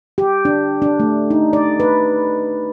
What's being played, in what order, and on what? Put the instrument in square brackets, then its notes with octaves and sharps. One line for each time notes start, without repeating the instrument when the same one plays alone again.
[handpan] G4
D4
D4
A3
D#4
D5
B4